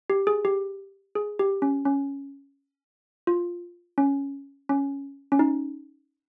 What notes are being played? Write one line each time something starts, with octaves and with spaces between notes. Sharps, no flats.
G4
G#4
G4
G#4
G4
C#4
C#4
F4
C#4
C#4
C#4
D#4